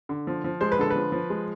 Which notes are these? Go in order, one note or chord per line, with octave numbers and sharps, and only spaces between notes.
D3
F3
F3
G#3 C5
B4
D3 A4
B4
F3
F3
G#3